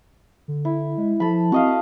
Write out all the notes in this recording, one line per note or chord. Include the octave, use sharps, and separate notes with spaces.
D3
E4
G#3
F3 A4 B5
C4 F#4 D#5 F5